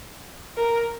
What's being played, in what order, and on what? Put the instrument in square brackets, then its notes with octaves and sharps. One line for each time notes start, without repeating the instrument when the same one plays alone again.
[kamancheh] A#4